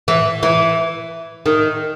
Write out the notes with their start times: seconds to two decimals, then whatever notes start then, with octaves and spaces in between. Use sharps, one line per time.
0.08 E3
0.43 E3
1.46 D#3